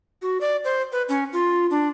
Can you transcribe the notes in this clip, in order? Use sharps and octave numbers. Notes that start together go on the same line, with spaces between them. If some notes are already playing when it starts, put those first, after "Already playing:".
F#4
D5
C5
B4
C#4
F4
D4